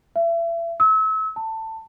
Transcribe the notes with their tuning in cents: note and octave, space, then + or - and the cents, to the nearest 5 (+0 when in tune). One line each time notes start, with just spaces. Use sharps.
E5 +35
E6 -35
A5 +20